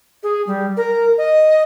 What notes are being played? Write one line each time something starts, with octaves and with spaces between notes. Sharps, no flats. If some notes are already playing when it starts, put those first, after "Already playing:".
G#4
G3
A#4
D#5